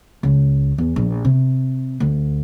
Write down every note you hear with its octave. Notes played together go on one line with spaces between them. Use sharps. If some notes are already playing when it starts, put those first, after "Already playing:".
C#2
E2
A#1
C3
D2